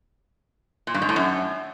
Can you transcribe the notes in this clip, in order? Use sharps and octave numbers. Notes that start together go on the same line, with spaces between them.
A#2
G2
G#2
A2
F#2